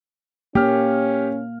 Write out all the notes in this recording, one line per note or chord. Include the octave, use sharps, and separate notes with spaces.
A#3 C#4 G4 F6